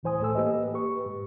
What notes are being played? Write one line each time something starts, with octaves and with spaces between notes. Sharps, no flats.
C#2 A2 E3 C5 G#5 D#6
C2 A2 A4 E6
A#3 G4 B4 D#5
G4 B4 C#6
G#2